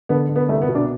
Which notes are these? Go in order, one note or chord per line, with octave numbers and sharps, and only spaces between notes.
D3 B3
D3
B3
C2 A3
B3
B2
D4